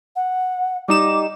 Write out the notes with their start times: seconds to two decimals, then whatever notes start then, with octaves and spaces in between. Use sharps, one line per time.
0.16 F#5
0.88 G3 D#4 D6 E7